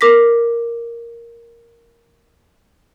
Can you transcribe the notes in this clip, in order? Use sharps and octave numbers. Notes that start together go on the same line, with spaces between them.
A#4 D6 A#6 B6